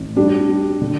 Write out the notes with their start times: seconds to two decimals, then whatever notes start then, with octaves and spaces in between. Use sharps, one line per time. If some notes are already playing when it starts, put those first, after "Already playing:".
Already playing: A1
0.16 G3 D4
0.49 G3
0.81 D3